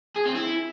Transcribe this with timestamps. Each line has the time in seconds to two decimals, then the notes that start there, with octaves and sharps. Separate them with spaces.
0.16 G#4
0.25 C4
0.35 E4